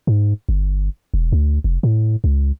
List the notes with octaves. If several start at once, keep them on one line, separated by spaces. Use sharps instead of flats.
G#2
G1
E1
D2
F1
A2
C#2